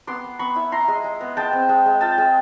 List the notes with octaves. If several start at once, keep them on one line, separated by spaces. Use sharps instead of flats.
B3 C6 D6
B3
B3 B5 C#6
E4
E4 A#5 C6
G#3
G#3
B3
G#3 G5 A5
C4
G#3
G#3
F4 G5 A5
G#3